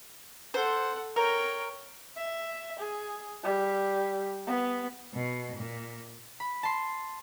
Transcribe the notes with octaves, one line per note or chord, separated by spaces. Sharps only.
A4 C5 F#5
A#4 C#5 G5
E5
G#4
G3
B3
B2
A#2
B5
A5 C6